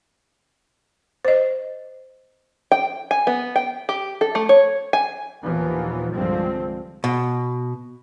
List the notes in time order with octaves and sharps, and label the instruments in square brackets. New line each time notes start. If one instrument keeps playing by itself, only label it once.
[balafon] C5 D#5
[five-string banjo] G5
G#5
B3
G5
G4
A4
A3
C#5
G#5
[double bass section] D#2 A#2 E3 F3 B3
C2 G2 D3 F3 G#3 C4
[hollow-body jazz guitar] B2